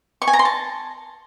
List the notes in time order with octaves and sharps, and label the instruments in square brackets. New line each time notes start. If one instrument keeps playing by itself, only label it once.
[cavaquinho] C#6
G#5
A#5
C6
A5